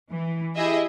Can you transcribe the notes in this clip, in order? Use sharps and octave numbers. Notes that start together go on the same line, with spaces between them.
E3
E4 G4 G#4 D#5 E5